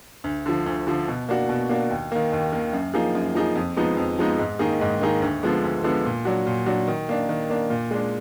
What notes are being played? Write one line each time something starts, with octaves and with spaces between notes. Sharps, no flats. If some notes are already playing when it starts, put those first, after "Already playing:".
D2
D3 F3
D2
D3 F3
B2
A#3 D4 F#4
B2
A#3 D4 F#4
D#2
D#3 A#3
D#2
D#3 A#3
F#2
F3 A#3 D#4 G#4
F#2
F3 A#3 D#4 G#4
F2
F3 G#3 B3 D#4
F2
F3 G#3 B3 D#4
G#2
D#3 A#3 D#4 G#4
G#2
D#3 A#3 D#4 G#4
D2
D3 F3 G#3 B3
D2
D3 F3 G#3 B3
A#2
F#3 D4 F#4
A#2
F#3 D4 F#4
D#3
A#3 D4
D#3
A#3 D4
A#2
G#3 D4